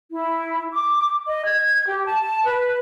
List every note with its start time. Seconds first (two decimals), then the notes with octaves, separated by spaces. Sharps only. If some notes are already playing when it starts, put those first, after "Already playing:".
0.10 E4
0.72 D6
1.28 D#5
1.46 G#6
1.87 G4
2.05 A5
2.45 B4